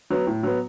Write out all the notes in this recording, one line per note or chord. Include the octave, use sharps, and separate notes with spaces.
F#3 B3
A2
F#3 B3